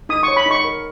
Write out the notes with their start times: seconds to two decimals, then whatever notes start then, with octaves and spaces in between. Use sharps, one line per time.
0.09 D#4 D#6
0.23 C#6
0.28 C#5
0.36 B5
0.46 D#4 C#6
0.64 A#4